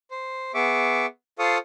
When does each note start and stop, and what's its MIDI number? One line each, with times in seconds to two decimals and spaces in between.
0.11 0.52 72
0.54 1.06 59
0.54 1.06 68
0.54 1.06 76
0.54 1.06 85
0.54 1.06 86
1.39 1.58 65
1.39 1.58 69
1.39 1.58 72
1.39 1.58 77
1.39 1.58 85
1.39 1.58 87